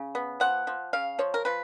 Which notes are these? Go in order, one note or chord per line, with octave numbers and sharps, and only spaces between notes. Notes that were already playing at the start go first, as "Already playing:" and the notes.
Already playing: C#3
B3
F3 F#5
F3
C#3 F5
F3 C#5
A#4
F3 B4